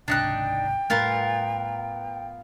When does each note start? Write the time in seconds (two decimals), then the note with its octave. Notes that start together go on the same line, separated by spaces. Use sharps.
0.08 G#1 C#2 C3 D4 D#4 G5 F#6
0.90 A2 G3 A3 B3 F4 A#4